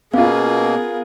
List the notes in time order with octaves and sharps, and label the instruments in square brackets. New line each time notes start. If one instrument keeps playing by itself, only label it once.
[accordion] B2 A#3 [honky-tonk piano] B3 F4 [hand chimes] C#4 F5 [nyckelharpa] G#4 A#4